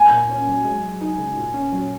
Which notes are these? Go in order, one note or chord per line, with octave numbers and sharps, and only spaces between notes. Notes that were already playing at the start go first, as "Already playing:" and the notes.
Already playing: A#3 G#5
A#2
C#4
F#3
G#3
G#3
D#4
C#3
A#2
C#4
F#3